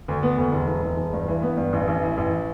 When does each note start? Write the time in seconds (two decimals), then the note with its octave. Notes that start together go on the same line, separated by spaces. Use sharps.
0.08 D2
0.23 B3
0.38 D2
0.52 E1
0.68 E1
0.83 E1
0.97 E1
1.13 G2
1.28 E3
1.42 B3
1.57 G2
1.73 A1
1.88 A1
2.02 E3
2.18 A1